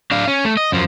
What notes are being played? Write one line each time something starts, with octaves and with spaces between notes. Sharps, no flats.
D4 F5
C#4
A3
D#5
F#2 F3